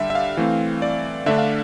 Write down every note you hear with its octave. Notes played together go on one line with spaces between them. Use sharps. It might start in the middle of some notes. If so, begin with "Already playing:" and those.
Already playing: D3 G3 D4 E5 G5
E5
F5
E3 A3 C4
D5
D3 A3 D4 E5
F5